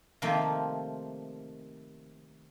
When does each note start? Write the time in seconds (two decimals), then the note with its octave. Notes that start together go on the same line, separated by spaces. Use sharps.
0.22 C3 D#3 F3 A3 A#3 C4